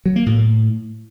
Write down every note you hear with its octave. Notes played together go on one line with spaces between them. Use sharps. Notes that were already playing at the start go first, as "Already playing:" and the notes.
F#3
A#3
A2